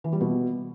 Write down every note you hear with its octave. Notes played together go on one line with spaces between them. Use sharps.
E3
G3
B2